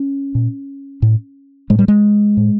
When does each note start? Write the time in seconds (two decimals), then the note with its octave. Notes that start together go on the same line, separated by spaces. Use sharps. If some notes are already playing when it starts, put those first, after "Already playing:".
Already playing: C#4
0.35 A#2
1.02 A2
1.70 A2 G#3
1.79 G3
1.88 G#3
2.37 A2